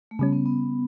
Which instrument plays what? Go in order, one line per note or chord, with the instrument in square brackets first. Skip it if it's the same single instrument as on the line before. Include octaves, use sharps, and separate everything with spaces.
[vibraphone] A3
[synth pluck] C#3 G3 C#4 [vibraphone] B3
[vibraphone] B3
B3